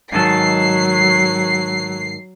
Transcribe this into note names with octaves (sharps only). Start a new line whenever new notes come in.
G#2 D#3 F#3 A4 C7